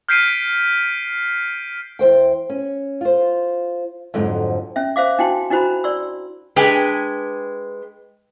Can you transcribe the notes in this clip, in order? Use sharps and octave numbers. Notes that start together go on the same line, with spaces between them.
F6 G6 B6 C7 D7 D#7
E2 C5 G5
C#4
F4 C5
F2 G#2 D3 F3 F#3
C#4 E5
C5 E5 F5 D6
D4 E4 F#4 G5 A5 C6
D4 E4 F#4 C5 A#5 B5
D5 C6 E6
G#3 D4 G4 B4 G5 G#5